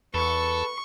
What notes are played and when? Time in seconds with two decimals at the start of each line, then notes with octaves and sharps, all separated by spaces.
0.14 E2 A4 B4 C#6